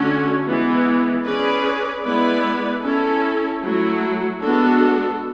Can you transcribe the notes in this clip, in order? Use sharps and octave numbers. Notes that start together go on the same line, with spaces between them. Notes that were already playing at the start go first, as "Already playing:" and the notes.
Already playing: D3 A3 C#4 F#4
E3 G#3 B3
C#4 G#4 B4 D5
G#3 B3 E4 B4 D5
C#4 E4 A4
F#3 A3 E4
G#3 B3 D4 F#4 A4